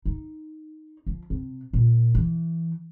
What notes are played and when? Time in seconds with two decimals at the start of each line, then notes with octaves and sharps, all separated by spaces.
0.05 D#4
1.07 F3
1.30 C3
1.73 A#2
2.15 E3